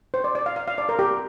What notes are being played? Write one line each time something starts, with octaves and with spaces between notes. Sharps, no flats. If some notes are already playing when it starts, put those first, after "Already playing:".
C5
D5
D5
F5
F5
F5
D5
A#4
G4